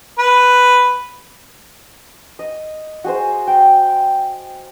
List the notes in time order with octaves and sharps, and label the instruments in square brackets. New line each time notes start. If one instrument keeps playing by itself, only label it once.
[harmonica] B4
[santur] D#5
F#4 G#4 C5
G5